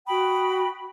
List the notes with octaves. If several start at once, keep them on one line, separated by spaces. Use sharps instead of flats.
F#4 G5 B5 D#6